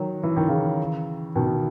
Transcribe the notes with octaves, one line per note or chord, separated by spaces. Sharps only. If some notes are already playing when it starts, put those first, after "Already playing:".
Already playing: D#3 F#3
E3
D#3
C#3 E3
B2 D#3